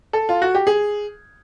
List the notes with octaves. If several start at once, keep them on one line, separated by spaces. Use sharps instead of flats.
A4
F4
F#4
G4
G#4